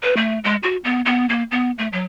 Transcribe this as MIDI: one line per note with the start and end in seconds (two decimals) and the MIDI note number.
0.03 0.17 71
0.17 0.39 57
0.44 0.56 56
0.63 0.77 66
0.84 1.01 59
1.05 1.28 59
1.29 1.43 58
1.51 1.71 59
1.78 1.88 57
1.93 2.04 54